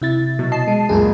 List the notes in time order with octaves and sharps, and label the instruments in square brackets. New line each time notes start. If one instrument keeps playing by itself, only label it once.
[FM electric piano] C3 E4 A6
[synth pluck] B2 F#3
D#5 A5 C7
[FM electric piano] G#3
[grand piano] C#2 F#2 A#2 [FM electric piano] G#4 A#4